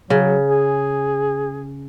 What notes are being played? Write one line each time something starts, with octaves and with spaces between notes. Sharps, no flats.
C#3 F#3
G#4